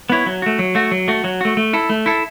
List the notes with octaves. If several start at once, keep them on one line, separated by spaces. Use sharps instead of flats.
B3 E4 C#5
F#3
A3 F#4
F#3
A3 F#4
F#3
A3 F#4
F#3
A3 F#4
A3
E4 A4
A3
E4 A4